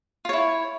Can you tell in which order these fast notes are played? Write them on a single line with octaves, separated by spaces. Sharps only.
F4 C#5 E4